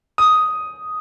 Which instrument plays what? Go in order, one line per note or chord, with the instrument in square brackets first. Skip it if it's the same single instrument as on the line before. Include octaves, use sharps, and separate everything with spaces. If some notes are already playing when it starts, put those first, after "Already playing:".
[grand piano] D#6